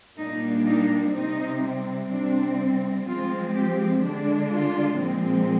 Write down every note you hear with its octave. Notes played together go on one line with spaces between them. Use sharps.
A#2 G3 A#3 D4 D#4
D#4
C3 G3 C4 D#4
C3 G3 C4 D4
F3 G#3 C4 F4
G4
D3 G#3 D4
F4
A#2 F3 G#3 C4